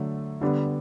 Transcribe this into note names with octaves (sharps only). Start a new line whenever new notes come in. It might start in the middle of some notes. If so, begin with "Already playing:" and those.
Already playing: D3 F#3 A3
D3 G3 B3 D4